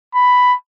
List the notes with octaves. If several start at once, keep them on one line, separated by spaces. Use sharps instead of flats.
B5